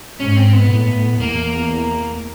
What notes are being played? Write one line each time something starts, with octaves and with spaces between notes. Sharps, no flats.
G#2 C#4
C4
B3
A2
E2 A#3